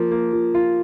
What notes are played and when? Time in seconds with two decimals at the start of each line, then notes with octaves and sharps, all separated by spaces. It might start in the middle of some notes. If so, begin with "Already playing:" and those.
Already playing: F3 A#3
0.12 A#3
0.33 F3
0.55 F4